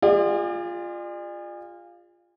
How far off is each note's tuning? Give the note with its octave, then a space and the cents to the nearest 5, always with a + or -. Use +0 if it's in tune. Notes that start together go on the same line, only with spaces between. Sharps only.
F4 +0 G#4 -35 D5 +40